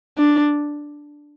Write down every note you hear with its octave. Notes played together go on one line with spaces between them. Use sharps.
D4